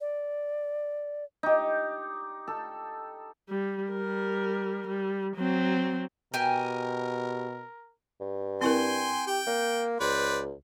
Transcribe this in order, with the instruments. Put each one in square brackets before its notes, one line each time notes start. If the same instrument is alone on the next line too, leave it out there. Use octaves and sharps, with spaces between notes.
[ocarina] D5
[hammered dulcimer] D#4 G4
A4
[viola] G3
G3 A#4
G3
F#3 C4
[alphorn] B2 [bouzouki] G4 G#5 [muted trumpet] A#4
[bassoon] G2
[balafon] C4 E4 A#4 [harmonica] G5 G#5 C6
[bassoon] G4 [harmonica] G5
[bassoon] A#3
[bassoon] C#2 [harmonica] B4 C5 D5